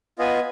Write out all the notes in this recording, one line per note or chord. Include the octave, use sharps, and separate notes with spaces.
B3 F4 B4 D#5 G#5